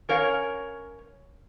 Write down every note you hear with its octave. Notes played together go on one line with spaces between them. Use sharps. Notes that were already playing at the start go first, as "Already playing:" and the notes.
C#4 A#4 C#5 F5